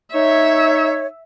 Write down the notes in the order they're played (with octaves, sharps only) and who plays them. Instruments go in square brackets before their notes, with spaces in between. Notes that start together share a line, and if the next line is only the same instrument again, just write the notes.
[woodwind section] D#4 C#5 [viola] E5